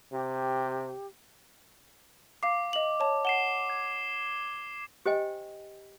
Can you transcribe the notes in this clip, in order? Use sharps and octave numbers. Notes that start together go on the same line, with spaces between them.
C3 G4
F5 D6 C7
D#5 F#7
C#5 A5
F#5 C7 E7 G7
G#6
G4 C5 D#5 G5 G#5